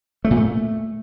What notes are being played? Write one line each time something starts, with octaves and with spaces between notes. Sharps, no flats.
A3
A#2
A3